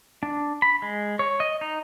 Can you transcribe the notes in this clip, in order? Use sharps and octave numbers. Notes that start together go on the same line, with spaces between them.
D4
B5
G#3
C#5
D#5
D#4